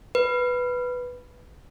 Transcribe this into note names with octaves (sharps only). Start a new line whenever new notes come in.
B4